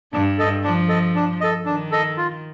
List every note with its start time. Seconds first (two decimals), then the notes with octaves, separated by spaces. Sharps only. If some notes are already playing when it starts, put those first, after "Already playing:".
0.13 G2 D4
0.38 A4 D#5
0.64 F3 D4
0.88 A4 D#5
1.15 D4
1.41 A4 D#5
1.66 D#3 D4
1.92 A4 D#5
2.17 F4